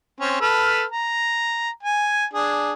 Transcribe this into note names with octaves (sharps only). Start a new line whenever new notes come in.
C4 C#4
A4 B4 F6
A#5
G#5
D4 G#4